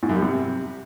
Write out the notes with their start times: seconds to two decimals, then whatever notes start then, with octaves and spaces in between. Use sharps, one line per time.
0.03 G#2
0.09 F#2
0.16 G3
0.22 C3